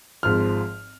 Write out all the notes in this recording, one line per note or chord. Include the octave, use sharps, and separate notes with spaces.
G#1 G#2 F3 F6